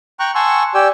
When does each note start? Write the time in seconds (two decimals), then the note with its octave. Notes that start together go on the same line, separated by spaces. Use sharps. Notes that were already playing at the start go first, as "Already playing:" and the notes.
0.20 G5 A#5 C#6 F#6
0.35 F#5 G#5 A5 C6 C#6 E6
0.75 G4 D5 G5 G#5 E6